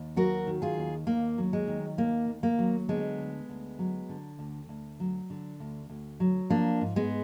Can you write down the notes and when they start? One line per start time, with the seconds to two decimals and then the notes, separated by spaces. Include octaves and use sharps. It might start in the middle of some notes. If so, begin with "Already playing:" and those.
Already playing: D#2
0.16 F#3 F#4 A#4
0.47 D#3
0.62 F4 G#4
0.77 D#2
1.07 D#2 A#3
1.38 F#3
1.53 G#3
1.67 D#3
1.98 D#2 A#3
2.28 D#2
2.43 A#3
2.59 F#3
2.89 D3 G#3 B3
3.18 D2
3.49 D2
3.79 F#3
4.09 D3
4.39 D2
4.69 D2
5.00 F#3
5.30 D3
5.60 D2
5.90 D2
6.20 F#3
6.50 F3 A#3 D4
6.81 G#2
6.96 G#3 B3